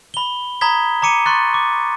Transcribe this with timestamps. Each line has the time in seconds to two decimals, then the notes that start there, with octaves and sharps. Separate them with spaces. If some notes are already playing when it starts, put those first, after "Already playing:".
0.14 B5 G7
0.61 A#5 B5 D#6 G#6 B6 G7
1.02 A#5 D6 C#7 D#7
1.26 C6 C#6 F#6 A6
1.54 D6